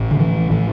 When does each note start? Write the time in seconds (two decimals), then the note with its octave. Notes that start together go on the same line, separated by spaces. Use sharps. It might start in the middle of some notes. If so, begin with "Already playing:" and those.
Already playing: A1 A2
0.11 D3
0.20 E3
0.51 A2 E3